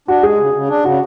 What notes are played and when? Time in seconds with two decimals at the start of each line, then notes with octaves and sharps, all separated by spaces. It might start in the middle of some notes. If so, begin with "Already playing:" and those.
0.08 D4 F#4
0.23 G#3 G#4
0.39 C#3
0.54 C#3
0.69 D4
0.84 C#3 F#4